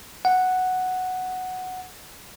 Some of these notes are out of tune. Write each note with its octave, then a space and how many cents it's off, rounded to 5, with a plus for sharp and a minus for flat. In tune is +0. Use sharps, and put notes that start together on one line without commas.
F#5 +0